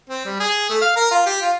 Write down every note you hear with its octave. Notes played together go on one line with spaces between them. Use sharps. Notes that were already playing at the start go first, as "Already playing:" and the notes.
C4
G3
G#4
A3
F5
A#4
F4
G4
F4